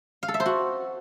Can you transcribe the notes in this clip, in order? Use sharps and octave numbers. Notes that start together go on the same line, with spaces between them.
F5
A4
E5
C5
F#4